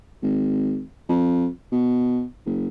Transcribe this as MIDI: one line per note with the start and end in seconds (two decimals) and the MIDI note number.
0.23 0.81 32
1.09 1.47 41
1.72 2.23 47
2.46 2.68 30